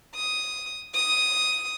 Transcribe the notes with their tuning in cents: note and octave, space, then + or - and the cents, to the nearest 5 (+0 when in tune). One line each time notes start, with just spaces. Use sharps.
D#6 +5
D#6 +5